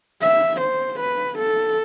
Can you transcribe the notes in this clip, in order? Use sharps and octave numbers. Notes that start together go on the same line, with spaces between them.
E5
C5
B4
A4